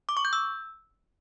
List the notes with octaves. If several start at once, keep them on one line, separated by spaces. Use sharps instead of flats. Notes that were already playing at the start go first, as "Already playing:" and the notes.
D6
C#6
G6
E6